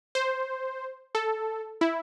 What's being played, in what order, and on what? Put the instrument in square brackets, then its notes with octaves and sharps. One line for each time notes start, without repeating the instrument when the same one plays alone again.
[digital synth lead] C5
A4
E4